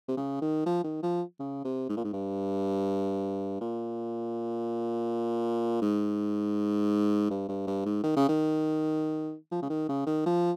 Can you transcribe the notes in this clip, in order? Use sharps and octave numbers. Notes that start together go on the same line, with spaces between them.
C3
C#3
D#3
F3
D#3
F3
C#3
C3
G#2
A#2
G#2
G2
A#2
G#2
G2
G2
G2
G#2
D#3
C#3
D#3
F3
C#3
D#3
C#3
D#3
F3